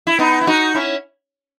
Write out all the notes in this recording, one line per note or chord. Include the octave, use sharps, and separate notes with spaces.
E4
B3 D#4
E4
D#4 F#4
C#4 E4